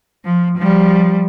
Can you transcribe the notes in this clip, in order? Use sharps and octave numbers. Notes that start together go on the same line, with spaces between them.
F3
F3 G3